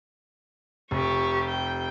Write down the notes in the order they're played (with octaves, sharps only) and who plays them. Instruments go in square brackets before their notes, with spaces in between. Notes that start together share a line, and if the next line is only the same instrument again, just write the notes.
[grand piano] F1 [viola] G4 C#6
[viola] G5